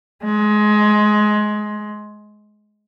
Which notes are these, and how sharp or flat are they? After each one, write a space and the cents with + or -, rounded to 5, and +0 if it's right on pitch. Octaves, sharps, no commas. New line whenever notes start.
G#3 +20